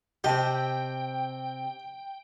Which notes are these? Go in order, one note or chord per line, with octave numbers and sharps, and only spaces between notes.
C3 C4 G4 D#5 G5 A5